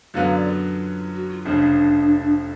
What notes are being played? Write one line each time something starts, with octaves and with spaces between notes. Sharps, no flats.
F#2 D3 F#3 B3 F5
D5
F4
F#4
F4
F1 F2 C#3 D4